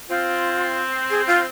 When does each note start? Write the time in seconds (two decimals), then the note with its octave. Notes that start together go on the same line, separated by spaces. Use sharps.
0.09 C4 F4
1.10 G#4
1.27 F4